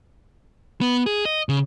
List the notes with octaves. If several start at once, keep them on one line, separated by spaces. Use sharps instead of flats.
B3
G#4
D#5
C#3